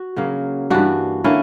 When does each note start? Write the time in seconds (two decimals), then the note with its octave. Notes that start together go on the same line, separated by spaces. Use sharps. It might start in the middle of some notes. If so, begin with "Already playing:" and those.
Already playing: F#4
0.16 C#3 F#3 A#3
0.70 G2 E3 A#3 D4 F#4
1.24 D3 A#3 C#4 E4